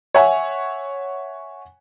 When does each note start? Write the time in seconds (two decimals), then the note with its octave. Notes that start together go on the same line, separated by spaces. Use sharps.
0.15 C#5 E5 F#5 G#5